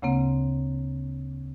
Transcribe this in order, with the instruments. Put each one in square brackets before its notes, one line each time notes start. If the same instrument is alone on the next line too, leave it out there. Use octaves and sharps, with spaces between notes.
[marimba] D2 C#3 A#3 C4